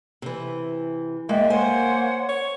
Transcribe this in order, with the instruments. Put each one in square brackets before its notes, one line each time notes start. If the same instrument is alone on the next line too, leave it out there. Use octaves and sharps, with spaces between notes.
[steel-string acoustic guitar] C3 E3
[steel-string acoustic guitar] G#3 [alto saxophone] A#3 [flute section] D5 E5 G5
[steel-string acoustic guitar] C5 G#5 [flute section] C#5 F#5 C6
[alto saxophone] C#5